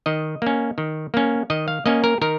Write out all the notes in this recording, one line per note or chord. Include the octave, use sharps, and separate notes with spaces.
D#3 D#5
A#3 C#4
D#3
A#3 C#4
D#3 D#5
F5
A#3 C#4 D#5
A#4
D#3 A#4